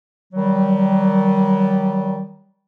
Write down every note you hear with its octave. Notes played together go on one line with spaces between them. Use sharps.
D#3 F#3 G3